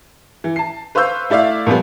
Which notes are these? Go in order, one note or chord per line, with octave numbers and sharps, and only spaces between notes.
E3
A5 C7
B4 C5 F5 C#6 E6 G6
A3 E4 D5 E5 F5
A#2 F3 G3 B3